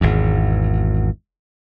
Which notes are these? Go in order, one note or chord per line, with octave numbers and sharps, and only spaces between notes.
G#1 E2